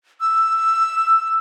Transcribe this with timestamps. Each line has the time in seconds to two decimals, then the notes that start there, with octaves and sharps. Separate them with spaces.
0.21 E6